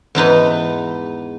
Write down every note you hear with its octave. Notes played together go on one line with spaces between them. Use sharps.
E2 G#2 D#4 B4